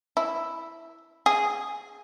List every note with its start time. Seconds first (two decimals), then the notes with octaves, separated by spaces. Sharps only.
0.17 E4
1.26 G#4